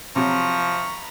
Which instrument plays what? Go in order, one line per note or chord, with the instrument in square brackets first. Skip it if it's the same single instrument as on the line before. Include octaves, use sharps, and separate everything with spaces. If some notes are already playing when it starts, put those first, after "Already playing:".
[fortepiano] C3 F#3 [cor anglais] F3 [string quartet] A#5 B5 [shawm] C#6